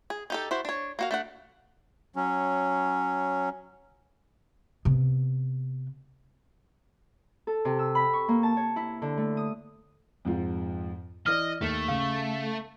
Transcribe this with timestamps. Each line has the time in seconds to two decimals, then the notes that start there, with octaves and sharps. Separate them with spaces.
0.10 G#4
0.30 D#4 G4 A4
0.51 E4 F#4 C5
0.65 D4 C#5
0.99 A#3 F#4 F5
1.11 A3 D4 F#5
2.16 F#3 C#4
4.85 C3 B3
7.47 A4
7.65 C3
7.79 E6
7.95 B5
8.13 C#6
8.28 A#3
8.43 A5
8.57 C#5
8.76 E4
9.02 D3
9.18 A3
9.37 D#6
10.25 F2 G#2 F3
11.26 E3 D5 D#5 F6
11.61 D#2 A3
11.88 C#3 F5